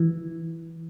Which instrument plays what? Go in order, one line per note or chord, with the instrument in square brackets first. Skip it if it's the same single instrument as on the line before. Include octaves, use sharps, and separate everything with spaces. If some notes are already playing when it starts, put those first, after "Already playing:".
Already playing: [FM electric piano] E3